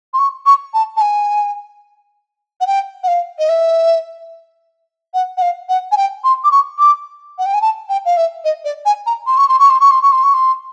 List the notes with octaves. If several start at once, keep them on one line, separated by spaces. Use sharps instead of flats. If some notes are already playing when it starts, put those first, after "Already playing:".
C6
C#6
C#6
A5
A5
G#5
F#5
G5
F#5
F5
D#5
E5
F#5
F#5
F5
F#5
G#5
G5
C6
D6
C#6
D6
F#5
G5
G#5
A5
G5
F5
E5
D#5
D5
G#5
A#5
C6
C#6
C6
C#6
C6
C#6
C6
C#6
C6
C#6
C6